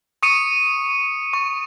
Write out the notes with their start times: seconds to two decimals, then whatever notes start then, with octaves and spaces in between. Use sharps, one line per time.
0.23 C#6 D#6 C#7 D#7
1.33 C#6